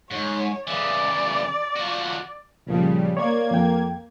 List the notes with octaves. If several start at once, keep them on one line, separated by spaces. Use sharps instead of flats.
G#2 C#5
C#3 E3 D5
F3 F#4
C#2 A#2 C#3 F3 G3
A#3 C#5 D5 G#6
F2 G5